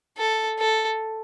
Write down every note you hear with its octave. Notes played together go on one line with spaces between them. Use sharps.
A4
A4